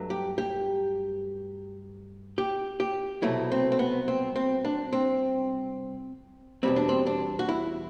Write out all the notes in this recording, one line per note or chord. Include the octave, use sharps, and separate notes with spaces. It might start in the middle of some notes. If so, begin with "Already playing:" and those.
Already playing: G2 F#3 A3
G4
G4
G4
G4
C2 B2 F#3 A3 E4
C4
C4
B3
C4
C4
D4
C4
E2 B2 G3 C4
D4
C4
D4
F#4
E4